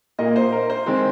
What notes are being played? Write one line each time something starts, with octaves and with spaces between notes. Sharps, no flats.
A#2 A#3 D#5
C5
A#4
C5
D#3 G#3 C4